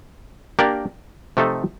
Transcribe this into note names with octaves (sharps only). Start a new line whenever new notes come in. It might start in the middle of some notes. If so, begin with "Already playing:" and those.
A#3 D4 G4 A#4 D5
C3 F3 A3 D#4 A4